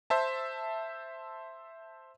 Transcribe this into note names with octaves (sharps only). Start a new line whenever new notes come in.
C5 E5 A5